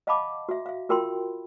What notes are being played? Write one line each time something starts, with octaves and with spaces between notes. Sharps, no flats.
D#5 F5 F#5 A5 B5 D6
F#4 E5
E5 F5
F4 F#4 A#4 G5 B5 C6